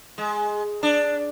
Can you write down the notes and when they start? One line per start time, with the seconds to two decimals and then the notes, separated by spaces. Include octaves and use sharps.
0.18 G#3
0.83 D4